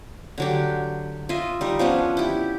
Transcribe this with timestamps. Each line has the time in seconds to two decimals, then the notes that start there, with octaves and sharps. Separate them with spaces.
0.38 D3 F#3 G4
1.29 F4 D#5 E5
1.61 G3 D#4
1.79 F3 B3 C#4 D4
2.17 E4 G4